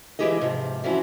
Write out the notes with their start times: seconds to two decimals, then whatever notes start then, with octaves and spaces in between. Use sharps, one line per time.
0.19 E3 G#3 E4 G4 G#4 D#5
0.41 G#2 C3 F3
0.84 E3 F3 C4 C#4 E4 F#4